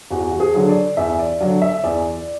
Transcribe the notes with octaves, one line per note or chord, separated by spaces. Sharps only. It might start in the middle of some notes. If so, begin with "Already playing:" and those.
E2 F#4
F#4
G#4
D3 F#3
D5
E2 E5
D5
D3 F#3 D5
E5
E2 D5